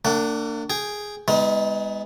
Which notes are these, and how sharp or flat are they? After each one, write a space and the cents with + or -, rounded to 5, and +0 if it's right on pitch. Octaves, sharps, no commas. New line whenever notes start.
A#3 -40 D4 +0 F#5 +30
G#4 +0 G5 +5
G#3 -25 B3 +15 D#4 +35